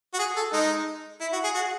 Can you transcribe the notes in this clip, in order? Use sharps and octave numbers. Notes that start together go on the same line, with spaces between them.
F#4
G#4
A4
G#3 D#4
E4
F#4
G#4
F#4